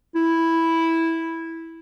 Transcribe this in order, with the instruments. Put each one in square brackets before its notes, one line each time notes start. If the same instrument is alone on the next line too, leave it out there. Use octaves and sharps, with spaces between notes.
[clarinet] E4